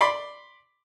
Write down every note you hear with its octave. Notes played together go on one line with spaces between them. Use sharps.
D5 B5 C6